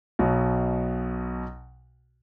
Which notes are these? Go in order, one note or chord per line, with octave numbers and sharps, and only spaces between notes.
B1 B2